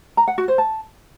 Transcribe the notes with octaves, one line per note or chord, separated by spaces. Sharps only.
A#5
F#5
F#4
C5
A5